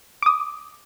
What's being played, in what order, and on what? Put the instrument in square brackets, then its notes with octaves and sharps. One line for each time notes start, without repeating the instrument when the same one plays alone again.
[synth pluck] D6 D#6